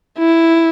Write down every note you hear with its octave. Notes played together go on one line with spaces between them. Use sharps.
E4